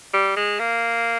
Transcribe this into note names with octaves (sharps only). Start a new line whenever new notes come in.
G3
G#3
A#3